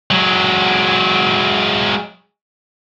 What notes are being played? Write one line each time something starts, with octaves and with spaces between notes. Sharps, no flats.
F#3 G#3